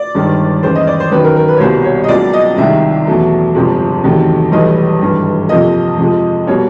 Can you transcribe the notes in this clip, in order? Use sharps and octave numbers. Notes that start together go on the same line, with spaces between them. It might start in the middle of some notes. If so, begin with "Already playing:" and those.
Already playing: D5
G1 G2 D#3 G#3
D#2 C#3 E3 G#3 C5
D#5
D5
C5
F#2 D#3 F#3 B4
A#4
A#4
B4
C#5
C2 B2 G3 A#3 C5
C#5
D#5
C#2 B2 F#3 A#3 D5
D#5
C2 C3 D#3 G#3 E5
E2 B2 F#3 A3
G1 F2 C3 F3 G#3
E2 C3 D#3 F#3 A3
B1 A2 E3 G3 D#5
G#1 G2 E3
F2 C3 F3 A#3 D#5
F2 C3 F3 G#3
B2 G3 A#3 C#5